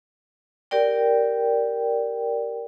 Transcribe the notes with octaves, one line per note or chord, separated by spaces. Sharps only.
G4 A#4 D5 G5